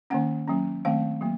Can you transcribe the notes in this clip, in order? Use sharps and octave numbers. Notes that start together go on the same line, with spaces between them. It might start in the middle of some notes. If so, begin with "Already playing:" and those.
D#3 A#3 C#4 F#5
F#3 A#3 C#4
D#3 A3 C4 F5
F#3 A#3